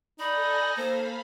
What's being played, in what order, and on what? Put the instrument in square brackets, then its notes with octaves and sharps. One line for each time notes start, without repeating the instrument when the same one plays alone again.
[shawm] D#4 [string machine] A4 G#5 A#6 [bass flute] D5 [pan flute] B5
[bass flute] A#3 [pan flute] C5 [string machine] F5 B5